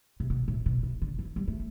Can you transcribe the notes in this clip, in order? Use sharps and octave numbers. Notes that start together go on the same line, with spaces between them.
C3
B2
A2
B2
C3
D3
E3
G3
A3